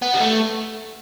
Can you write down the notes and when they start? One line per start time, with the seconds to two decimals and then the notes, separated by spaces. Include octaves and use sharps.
0.02 B3
0.14 G3
0.20 A3